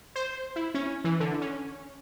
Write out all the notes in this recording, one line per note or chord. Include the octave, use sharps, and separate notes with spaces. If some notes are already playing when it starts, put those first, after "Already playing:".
C5
E4
C#4
E3
D3
C#4